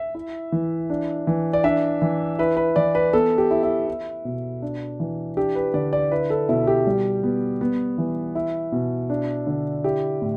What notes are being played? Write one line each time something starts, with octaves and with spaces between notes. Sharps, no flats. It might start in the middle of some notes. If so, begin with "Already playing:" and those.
Already playing: E5
E4
E3
D4
E3
D5
D4 E5
E3
E4 B4
B4
E3 D5
B4
B3 A4
G4
E4
E4
E4
B2
D4
E3
D4 G4
B4
D3 D5
D5
E4 B4
A4
B2 E4
G4
G3
B3
B3
E3
E4
B2
D4
D3
E4 G4
A2